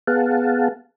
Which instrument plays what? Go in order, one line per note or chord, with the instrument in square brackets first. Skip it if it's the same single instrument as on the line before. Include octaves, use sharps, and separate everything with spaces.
[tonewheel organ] B3 G#4 F5 F#5 A5